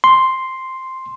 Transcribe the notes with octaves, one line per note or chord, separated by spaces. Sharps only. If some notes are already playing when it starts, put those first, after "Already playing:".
C6